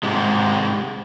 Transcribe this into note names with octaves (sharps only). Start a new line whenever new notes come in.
G#2 C3 G#3